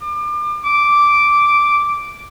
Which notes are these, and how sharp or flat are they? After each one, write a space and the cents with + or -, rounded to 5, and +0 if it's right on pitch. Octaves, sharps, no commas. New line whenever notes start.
D6 +35
D6 -5